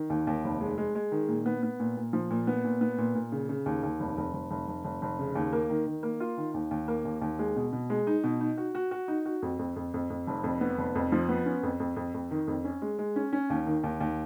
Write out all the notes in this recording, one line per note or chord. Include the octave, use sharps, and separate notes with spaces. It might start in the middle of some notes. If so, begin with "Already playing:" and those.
Already playing: D#3
D#2
D#2
F1
G#3
G#3
G#3
D#3
A#2
B3
B3
A#2
A#2
F3
A#2
B3
A#2
B3
A#2
A#2
C#3
C#3
D#2
D#2
F1
F1
F1
F1
F1
F1
F1
C#3
D#2
A#3
D#3
D#3
A#3
F4
D#3
D#2
D#2
A#3
D#2
D#2
G#3
B2
B2
G#3
D#4
B2
D#4
F#4
F#4
F#4
D#4
F#4
F2
F2
F2
F2
F2
F1
F2
B3
F1
F2
F3
B3
C#4
F2
F2
F2
F2
D#3
F2
C#4
G#3
G#3
C#4
C#4
D#2
D#3
D#2
D#2